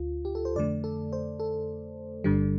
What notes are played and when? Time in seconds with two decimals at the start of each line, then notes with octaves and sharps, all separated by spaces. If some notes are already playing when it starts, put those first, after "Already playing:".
Already playing: D2 F4
0.25 G4
0.35 A4
0.45 C5
0.56 F2 D3 A3 D5
0.84 A4
1.13 C5
1.40 A4
2.24 G1 G2 D3 G3